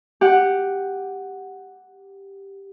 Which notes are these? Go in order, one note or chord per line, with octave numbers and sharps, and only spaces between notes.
G4 F#5